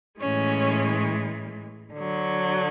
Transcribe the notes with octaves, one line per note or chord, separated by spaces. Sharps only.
A2 E3 G#3 C#4 C#5
D3 F#3